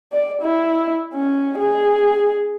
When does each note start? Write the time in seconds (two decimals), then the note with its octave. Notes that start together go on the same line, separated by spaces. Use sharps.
0.13 D5
0.42 E4
1.14 C#4
1.58 G#4